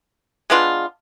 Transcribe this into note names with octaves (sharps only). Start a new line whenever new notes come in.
G#3 B3 D4 F4